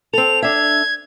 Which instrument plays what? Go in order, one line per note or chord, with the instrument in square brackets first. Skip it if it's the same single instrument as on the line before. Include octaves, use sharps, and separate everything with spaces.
[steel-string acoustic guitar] C4 A4 [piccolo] F7
[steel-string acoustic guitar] D4 E5 [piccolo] G#6